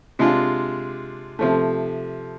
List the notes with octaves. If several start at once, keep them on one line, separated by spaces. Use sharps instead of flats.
C3 G#3 D4 F4
C3 F3 A3